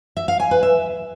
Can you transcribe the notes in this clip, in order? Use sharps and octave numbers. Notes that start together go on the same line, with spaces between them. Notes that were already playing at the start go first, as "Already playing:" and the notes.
E5
F5
G#5
B4
E5